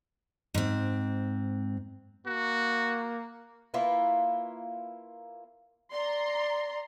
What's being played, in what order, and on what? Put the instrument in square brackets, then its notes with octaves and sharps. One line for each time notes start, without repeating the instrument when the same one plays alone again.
[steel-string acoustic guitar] G#2 C4
[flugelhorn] A#3 [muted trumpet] F#4
[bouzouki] A#3 E4 F4 B4
[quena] D5 [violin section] A#5 C6